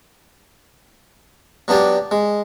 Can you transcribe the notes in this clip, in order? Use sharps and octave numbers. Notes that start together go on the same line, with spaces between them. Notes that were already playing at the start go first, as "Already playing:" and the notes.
F#3 B3 D4 G4 D5
G#3